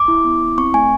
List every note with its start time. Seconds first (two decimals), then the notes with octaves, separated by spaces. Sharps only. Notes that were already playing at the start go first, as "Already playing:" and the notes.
Already playing: D6
0.08 E4
0.24 B3
0.41 E4
0.58 C4 C#6
0.74 A3 G#5